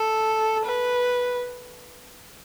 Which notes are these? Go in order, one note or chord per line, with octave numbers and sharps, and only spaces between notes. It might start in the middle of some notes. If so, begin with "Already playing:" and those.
Already playing: A4
B4